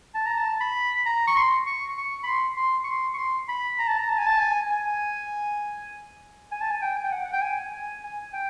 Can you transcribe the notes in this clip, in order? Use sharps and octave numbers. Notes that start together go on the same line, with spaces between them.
A5
A#5
A5
B5
A#5
C#6
C6
C#6
C#6
B5
C6
C6
C#6
C6
C#6
C6
B5
A#5
A5
A#5
A5
G#5
A5
G#5
G#5
G#5
A5
G#5
G5
G#5
G5
F#5
F#5
G5
G#5
G#5
G#5
G5